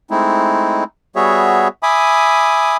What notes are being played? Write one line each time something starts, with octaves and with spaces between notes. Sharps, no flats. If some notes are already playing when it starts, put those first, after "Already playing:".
G#3 A3 C4 D#4 E4
G3 B3 F#4 G#4 C#5 E5
E5 G#5 B5 D6 D#6